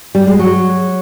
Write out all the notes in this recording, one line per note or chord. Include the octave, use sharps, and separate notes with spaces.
G3
G#3
F#3